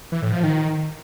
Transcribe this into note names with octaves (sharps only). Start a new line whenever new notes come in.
E3
A2
F3
D#3